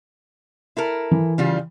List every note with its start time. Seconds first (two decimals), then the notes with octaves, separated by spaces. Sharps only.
0.77 E4 A4 A#4
1.11 E3
1.38 C#3 G3 F4